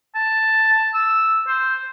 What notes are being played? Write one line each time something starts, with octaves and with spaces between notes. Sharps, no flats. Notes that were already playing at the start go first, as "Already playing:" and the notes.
A5
E6
C5